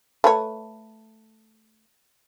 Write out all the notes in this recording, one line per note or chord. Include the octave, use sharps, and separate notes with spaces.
A3 B4 C#5